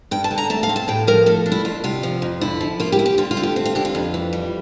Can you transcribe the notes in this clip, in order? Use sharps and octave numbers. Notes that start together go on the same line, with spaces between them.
G2 G5
A5
D3
A#5
A3 A5
F5
C4
A5
A2 G5
F3 A#4
A3 A4
D4
E4
F2 F4
C3 F4
F3
F2
D3 E4
F3
A#3 F4
G4
E4
G4
D3 F4
F4
A3
G4
C4
F4
D3 G4
F4
F2
E3
G3